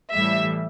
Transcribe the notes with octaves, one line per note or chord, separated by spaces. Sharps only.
A2 E3 G3 E5